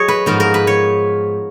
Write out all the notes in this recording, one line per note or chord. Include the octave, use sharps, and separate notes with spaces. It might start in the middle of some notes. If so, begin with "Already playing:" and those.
Already playing: F#3 G#4 C#5 D#5
B4
G#2 F3 B3 D#4 A#4
A#4
B4
C#5